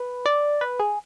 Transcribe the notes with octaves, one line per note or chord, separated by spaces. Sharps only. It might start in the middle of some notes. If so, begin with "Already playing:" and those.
Already playing: B4
D5
B4
G#4